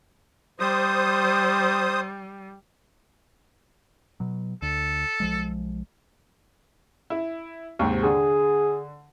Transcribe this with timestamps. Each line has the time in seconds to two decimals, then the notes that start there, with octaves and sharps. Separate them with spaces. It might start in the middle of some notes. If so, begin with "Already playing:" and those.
0.60 G3 C5 D#6
4.20 B2 F#3
4.62 D2 A4
5.20 B1 F3 G#3
7.10 E4
7.79 D#2 G#2 C3
8.03 D3 G#4